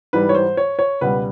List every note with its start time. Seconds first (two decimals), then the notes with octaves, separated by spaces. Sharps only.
0.13 G#2 E3 G3 B4
0.29 C#5
0.35 C5
0.57 C#5
0.79 C#5
1.01 C#2 B2 G3 B4